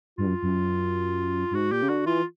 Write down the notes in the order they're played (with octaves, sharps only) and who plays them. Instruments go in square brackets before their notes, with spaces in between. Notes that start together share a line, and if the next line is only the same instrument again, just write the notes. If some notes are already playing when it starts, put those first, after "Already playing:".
[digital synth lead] G2 [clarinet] F4
[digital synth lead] F#2
F#2
G2
[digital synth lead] G#2 [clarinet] F#4
[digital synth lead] A#2 [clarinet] G4
[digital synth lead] C#3
[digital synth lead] D3 [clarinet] F#4
[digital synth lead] E3 [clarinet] F4